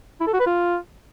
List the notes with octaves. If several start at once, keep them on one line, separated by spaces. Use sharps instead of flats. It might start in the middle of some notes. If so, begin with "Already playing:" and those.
E4
A4
F#4
B4
F4